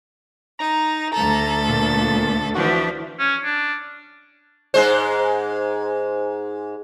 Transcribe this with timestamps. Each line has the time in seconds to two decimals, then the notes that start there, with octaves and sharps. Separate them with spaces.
0.59 D#4 A#5
1.13 D2 A4 A#5
1.69 A#2
2.55 E3 F3 D4 F#4
3.19 C#4
3.45 D4
4.74 G#2 G#3 C5